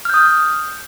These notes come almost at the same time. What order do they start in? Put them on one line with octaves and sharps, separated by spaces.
F6 G6 D#6